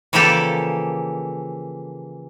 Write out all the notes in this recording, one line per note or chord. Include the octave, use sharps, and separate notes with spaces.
C#3 E3 F3 A#3 G4 A4